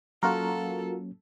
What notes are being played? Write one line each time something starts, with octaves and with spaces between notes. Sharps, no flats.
F#3 A#3 C#4 F4 F#4 A4 A#4